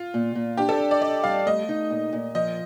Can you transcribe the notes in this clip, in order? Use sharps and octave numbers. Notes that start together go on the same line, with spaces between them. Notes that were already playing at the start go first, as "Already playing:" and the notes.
Already playing: F4
A#2
A#2
D4 G4
A4
A4
D5
D5 D#5
G3 F5
A3 D#5
D#4
A#2
A#2
F3 D#5